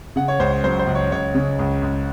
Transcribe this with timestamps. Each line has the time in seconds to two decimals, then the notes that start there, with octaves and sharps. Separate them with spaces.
0.16 C#3 F#5
0.28 C#5
0.39 C#2 C5
0.52 C#5
0.64 F#3 C5
0.79 C5
0.87 C#2
0.95 C#5
1.11 C#2 C#5
1.35 C#3
1.59 C#2
1.82 C#2